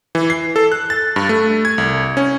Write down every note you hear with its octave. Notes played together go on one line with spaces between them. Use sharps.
E3
C7
A4
F#6
A6
G2
A3
G#6
C2
C#4